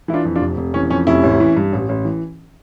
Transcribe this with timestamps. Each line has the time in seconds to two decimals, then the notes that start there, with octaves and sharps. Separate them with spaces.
0.08 E3 E4
0.13 D4 F4
0.25 F2
0.36 D4 F4
0.41 F1
0.57 F1
0.74 E3 C#4
0.90 F2 C#4
1.07 F1 C#4 E4
1.23 A1
1.40 E3
1.56 G2
1.73 A1
1.89 A1
2.05 E3